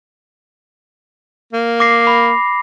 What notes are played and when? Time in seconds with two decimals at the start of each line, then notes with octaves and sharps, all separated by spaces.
1.53 A#3
1.80 D6 A#6 C7
2.07 B5